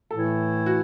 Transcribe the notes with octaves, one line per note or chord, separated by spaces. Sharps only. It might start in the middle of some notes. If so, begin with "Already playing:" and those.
A2 E3 A3 E4 A4
F#4